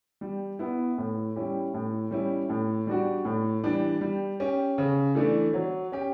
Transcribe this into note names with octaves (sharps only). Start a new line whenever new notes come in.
G3
B3 E4
A2
G3 C#4 E4 G4
A2
G3 C#4 E4
A2
G3 D4 F#4
A2
E3 G3 D4
G3
C#4 G4
C#3
E3 A3 D4
F#3
C#4 G4